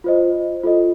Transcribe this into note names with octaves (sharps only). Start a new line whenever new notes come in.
F4 C5 D#5
F4 A4 D#5